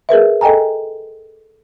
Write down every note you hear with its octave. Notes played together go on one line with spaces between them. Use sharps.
G#4 A#4 B4 E5
A4 D#5 G5 G#5 A#5